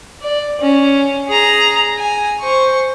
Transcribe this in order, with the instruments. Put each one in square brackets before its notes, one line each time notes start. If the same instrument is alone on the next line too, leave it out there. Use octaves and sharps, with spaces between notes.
[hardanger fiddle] D5
C#4
G#4 A#5
G#5
C5 C#6